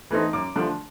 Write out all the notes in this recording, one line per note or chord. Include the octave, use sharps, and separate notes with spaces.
E3 A3 C4 D#4
F#2 D6
D3 F3 A3 D4